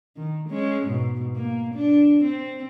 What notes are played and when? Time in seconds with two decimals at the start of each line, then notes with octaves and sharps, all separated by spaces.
0.16 D#3
0.49 G#3 C#4
0.85 G#2 B2
1.36 A#3
1.74 D4
2.24 C4